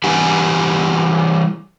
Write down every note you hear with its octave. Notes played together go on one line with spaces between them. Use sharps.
E3 G3 G4 F#5 G#5